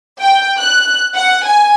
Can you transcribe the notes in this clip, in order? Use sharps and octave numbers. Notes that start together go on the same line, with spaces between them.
G5
F#6
F#5
G#5